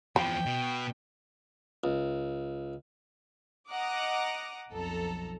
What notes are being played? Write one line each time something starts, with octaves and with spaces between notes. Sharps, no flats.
E2 F3 G5 B5
B2
C#2
D#5 F#5 A#5 D6 D#6
B1 F2 A4 A#5